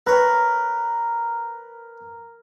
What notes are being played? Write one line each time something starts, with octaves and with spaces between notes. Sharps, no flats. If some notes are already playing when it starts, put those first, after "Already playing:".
A#4 B4 C#5